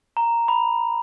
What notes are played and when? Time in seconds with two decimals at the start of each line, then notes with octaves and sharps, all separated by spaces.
0.17 A#5
0.48 B5